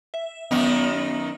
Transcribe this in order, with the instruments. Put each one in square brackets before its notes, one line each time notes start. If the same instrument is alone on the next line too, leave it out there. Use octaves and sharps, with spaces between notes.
[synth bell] E5
[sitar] F#2 D#3 D#4 [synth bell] B3